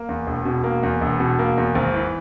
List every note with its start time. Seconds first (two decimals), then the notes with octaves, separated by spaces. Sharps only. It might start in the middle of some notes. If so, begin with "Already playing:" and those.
Already playing: A#3
0.09 E2
0.27 E1
0.45 B2
0.64 A#3
0.83 E2
1.01 E1
1.20 B2
1.39 A#3
1.57 E2
1.75 G#1
1.94 E3